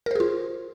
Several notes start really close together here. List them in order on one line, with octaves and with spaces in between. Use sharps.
A#4 C5 G#4 F4